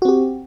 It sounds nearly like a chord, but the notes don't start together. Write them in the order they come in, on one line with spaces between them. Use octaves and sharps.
F#4 C4 G4